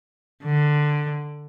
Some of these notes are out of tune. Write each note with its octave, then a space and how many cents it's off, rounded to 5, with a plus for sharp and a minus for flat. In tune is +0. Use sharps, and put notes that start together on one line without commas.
D3 +10